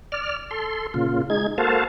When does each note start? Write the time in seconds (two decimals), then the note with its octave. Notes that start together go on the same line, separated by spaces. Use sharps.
0.12 D5 F6
0.51 A4 C6
0.94 A#2 C#3 F4
1.30 G#3 D#4 G#6
1.58 A#3 F#4 A4 C5 F5 A5